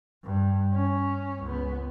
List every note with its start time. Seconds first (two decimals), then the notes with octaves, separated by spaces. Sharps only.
0.24 G2
0.73 C#4
1.43 C#2 B3